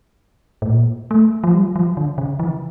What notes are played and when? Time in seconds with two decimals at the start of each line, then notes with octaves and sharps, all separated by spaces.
0.62 A2
0.68 A#2
1.11 A3
1.44 F3
1.54 G3
1.76 F3
1.97 D3
2.18 C#3
2.40 E3